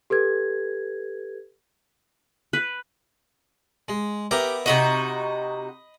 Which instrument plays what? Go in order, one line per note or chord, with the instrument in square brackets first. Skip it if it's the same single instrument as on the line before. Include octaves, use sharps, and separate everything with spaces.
[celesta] G4 A4 B4 G#6
[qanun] B4
[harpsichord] G#3
[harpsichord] B3 A#4 E5 [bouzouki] G4
[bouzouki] C3 D#4 F#4 [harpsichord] D#5 B5